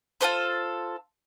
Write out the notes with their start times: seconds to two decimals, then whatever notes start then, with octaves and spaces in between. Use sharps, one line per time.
0.21 F4 A4 B4 C5